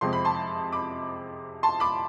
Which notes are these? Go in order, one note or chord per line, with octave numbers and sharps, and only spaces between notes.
F2 C3 F3 G#3 C4 C6
B5
A5 C6
B5 D6
A5 C6
B5 D6